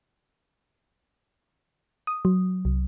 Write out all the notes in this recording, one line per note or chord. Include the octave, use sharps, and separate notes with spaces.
D#6
F#3
C2